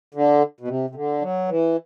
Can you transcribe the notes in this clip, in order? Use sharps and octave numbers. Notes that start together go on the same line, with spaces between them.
D3
B2
C3
C3
D3
F#3
E3